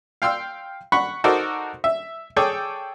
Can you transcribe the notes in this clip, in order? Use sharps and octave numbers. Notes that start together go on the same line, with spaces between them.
F5 G5 C6 E6
F#5 B5 C#6
D#4 F#4 A4 A#4 C5 D5
E5
G#4 A4 C#5 D5 G5